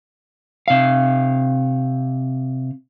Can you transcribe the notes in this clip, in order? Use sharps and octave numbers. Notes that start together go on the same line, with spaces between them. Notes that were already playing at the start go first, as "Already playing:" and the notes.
C3 F5